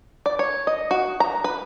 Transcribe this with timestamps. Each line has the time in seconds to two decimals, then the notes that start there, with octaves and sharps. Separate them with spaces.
0.26 D5
0.39 C#5
0.67 D#5
0.91 F#4
1.20 A#5
1.44 B4